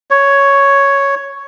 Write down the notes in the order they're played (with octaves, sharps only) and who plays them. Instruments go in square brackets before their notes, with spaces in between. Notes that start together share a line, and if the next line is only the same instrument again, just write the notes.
[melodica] C#5